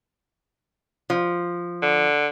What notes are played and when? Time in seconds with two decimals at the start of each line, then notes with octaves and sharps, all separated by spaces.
1.10 F3
1.82 D3